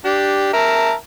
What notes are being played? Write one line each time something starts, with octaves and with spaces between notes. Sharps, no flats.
D4 G4
A#4 E5 A5